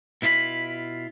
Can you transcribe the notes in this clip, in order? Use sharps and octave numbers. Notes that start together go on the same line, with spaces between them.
B2 E4 F4 D#5 B5